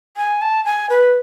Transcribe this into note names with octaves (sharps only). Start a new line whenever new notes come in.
G#5
A5
G#5
B4